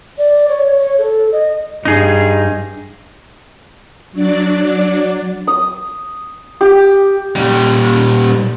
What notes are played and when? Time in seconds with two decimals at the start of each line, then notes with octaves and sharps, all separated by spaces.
0.18 D5
0.49 C#5
0.78 C#5
0.98 A4
1.32 D#5
1.85 G2 D#4 G#4
4.12 F#3 D4 D5
5.47 D#6
6.61 G4
7.36 A#2 G3